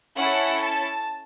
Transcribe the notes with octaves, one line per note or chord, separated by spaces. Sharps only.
C#4 E4 A4 F#5
A5